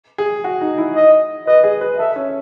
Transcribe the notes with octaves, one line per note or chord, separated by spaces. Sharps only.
G#4
F#4
D#4
E4
D#5
B4 D#5
G#4
B4
A4 E5
C#4